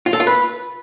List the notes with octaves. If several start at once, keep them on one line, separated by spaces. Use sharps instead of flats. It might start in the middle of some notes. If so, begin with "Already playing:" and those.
F4
A4
F4
B4